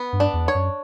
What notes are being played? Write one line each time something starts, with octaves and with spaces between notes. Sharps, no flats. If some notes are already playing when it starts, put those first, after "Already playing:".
Already playing: B3
G2
D4
E2
C#5
F#2